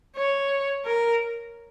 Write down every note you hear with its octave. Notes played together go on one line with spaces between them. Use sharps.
C#5
A#4